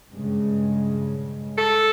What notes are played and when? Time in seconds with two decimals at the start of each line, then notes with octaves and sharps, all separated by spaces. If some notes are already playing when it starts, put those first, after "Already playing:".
0.11 G2 C#3 G#3
1.58 A4